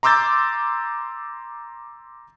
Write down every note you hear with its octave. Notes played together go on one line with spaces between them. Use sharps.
A#5 C6 D6 E6 G6 A6